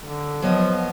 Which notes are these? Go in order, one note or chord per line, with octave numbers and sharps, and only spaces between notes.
D3
F3 F#3 B3 D#5